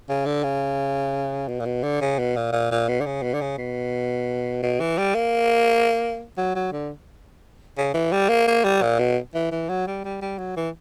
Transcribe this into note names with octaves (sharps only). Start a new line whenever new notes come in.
C#3
D3
C#3
B2
A#2
B2
D3
C#3
B2
A#2
A#2
A#2
B2
D3
C#3
B2
D3
C#3
B2
B2
E3
G3
A#3
F#3
F#3
D3
C#3
E3
G3
A#3
A#3
G3
A#2
B2
E3
E3
F#3
G3
G3
G3
F#3
E3